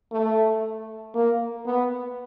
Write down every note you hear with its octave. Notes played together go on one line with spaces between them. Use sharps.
A3
A#3
B3